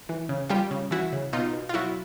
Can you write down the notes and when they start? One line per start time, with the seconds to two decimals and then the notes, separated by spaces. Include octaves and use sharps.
0.09 E3
0.29 C#3
0.49 G3 F4 G4
0.71 C#3
0.91 E3 E4 F#4
1.12 C#3
1.33 B2 D#4 F4
1.53 B2
1.69 F4
1.74 F#3 E4 F#4